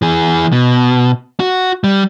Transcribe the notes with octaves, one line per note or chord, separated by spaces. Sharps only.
E3 G#4
B2
F#4
G3